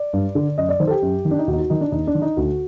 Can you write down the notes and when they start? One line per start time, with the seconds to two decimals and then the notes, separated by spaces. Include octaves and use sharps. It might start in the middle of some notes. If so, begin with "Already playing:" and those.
Already playing: D5
0.13 G2
0.35 D3
0.58 F#2 D#5
0.69 D5
0.80 D#3 C5
0.87 A4
0.91 G4
1.02 F#2
1.25 D#3
1.31 D4
1.39 D#4
1.48 D#2 F#4
1.53 D#4
1.59 F#4
1.70 D#3 D#4
1.81 D4
1.92 D#2 D#4
2.07 D4
2.15 D#3
2.22 D#4
2.37 D2 F#4